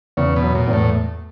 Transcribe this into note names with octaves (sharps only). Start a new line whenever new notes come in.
E2 C#3
B2
F#3
A#2
E2
A2